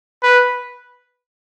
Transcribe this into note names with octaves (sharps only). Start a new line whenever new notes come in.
B4